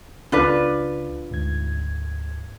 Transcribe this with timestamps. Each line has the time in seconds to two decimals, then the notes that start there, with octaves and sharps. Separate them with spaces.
0.32 C#2 C#3 D4 F4 B4
1.30 D2 G#2 G#6